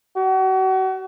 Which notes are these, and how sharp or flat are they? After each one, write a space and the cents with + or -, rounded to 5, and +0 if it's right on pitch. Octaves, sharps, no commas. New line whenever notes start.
F#4 +35